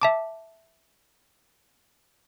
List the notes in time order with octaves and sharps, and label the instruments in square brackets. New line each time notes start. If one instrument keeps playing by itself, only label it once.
[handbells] E5 A5 D6